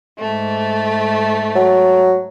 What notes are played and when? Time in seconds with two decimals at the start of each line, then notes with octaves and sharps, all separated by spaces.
0.19 G#2 A3
1.55 F#3